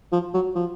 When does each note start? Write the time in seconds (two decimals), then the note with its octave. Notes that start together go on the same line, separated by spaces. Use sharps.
0.12 F3
0.34 F#3
0.55 F3